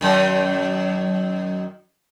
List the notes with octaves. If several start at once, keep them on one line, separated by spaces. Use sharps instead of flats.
F#2 D#3